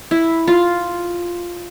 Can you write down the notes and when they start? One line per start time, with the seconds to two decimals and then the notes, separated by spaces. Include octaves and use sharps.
0.11 E4
0.48 F4